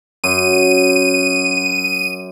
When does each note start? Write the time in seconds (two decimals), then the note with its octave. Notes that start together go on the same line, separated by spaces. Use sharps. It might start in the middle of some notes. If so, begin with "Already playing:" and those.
0.24 F#2 D#7